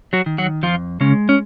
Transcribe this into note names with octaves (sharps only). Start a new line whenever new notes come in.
F#3 F#4
D#3
F#3 F#4
F2 F3 F4
C#3 G#3 C#4
C#4